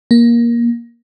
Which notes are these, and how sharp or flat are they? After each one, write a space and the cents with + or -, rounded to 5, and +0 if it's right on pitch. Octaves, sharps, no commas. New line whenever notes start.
A#3 +15